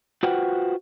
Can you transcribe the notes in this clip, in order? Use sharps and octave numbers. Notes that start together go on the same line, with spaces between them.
F4 F#4 B4 C5 F#5 G5